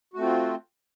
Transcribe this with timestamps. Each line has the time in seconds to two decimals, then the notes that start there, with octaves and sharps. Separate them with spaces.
0.14 F#4
0.16 A3
0.19 C4
0.22 F4